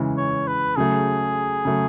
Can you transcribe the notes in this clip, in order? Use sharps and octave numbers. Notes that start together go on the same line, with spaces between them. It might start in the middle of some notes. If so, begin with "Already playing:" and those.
Already playing: C#3 E3 G#3
C#5
B4
C#3 F#3 A3 G#4
C#3 F#3 A3